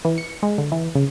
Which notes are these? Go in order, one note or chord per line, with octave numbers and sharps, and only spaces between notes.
E3
C#7
G#3
D3
E3
C#3